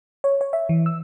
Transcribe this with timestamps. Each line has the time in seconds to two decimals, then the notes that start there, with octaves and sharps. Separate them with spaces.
0.24 C#5
0.41 C#5
0.53 E5
0.69 E3
0.86 E6